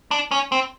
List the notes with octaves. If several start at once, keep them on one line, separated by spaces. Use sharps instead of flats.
D4
C#4
C4